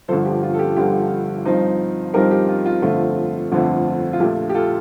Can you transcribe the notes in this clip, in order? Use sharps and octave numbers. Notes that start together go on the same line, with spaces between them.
G1 G2 D3 F3 A4 C5
G4
F4
A4
G4
G1 G2 D3 F3 G4
G2 F3 C4 D#4
G2 F3 C4 D#4 G4 A#4
G4
F4
F4
G1 F2 D3 A3 C4 F4
G1 F2 D3 A3 C4
F4
A#1 A#2 A3 G4
G4
F4 A4